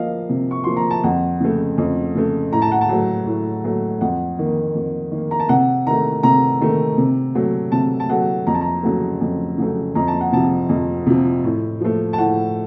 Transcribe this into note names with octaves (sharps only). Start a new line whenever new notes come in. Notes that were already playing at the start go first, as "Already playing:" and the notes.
Already playing: F3 A#3 D#5 F5
C3
C#6
F3 A#3 C6
A#5
A5
F2 F#5
C#3 A3
F2
C#3 A3
A2 A#5
A5
F#5
A5
F#3 A3
A2
F#3 A3
F2 F#5
D#3 A#3
F2
D#3 A#3
A#5
A5
C3 F#5
D#3 A3 A#5
C3 A#5
D#3 A3
C3
F#3 A3
C3 A5
A5
F#3 A3 F#5
F2 A#5
A5
A#5
C#3 F#3 A3
F2
C#3 F#3 A3
F2 A#5
A5
F#5
C3 F3 A5
F2
C3 F3
A2
F3 A3
A5
A2 F#5